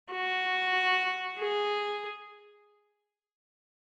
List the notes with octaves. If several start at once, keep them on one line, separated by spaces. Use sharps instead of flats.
F#4
G#4